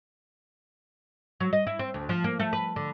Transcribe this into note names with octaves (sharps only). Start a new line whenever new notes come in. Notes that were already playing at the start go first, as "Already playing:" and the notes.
F#3
D#5
E4
C4
D2
F3
A#3
A3
B4
D3